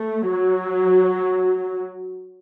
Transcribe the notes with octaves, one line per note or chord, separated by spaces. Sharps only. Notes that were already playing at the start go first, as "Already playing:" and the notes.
Already playing: A3
F#3